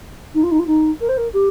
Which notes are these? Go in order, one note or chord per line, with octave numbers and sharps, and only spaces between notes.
D#4
F4
D#4
F4
D#4
A#4
C5
A#4
G4